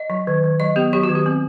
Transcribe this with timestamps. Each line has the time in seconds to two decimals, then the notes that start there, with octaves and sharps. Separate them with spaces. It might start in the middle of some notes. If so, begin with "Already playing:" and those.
Already playing: D#5
0.10 F#3
0.27 D#3
0.44 D#3
0.60 F#3 D#5
0.76 B3 G4
0.93 F#3 G4
1.03 F#4
1.09 D#3
1.15 G4
1.26 C4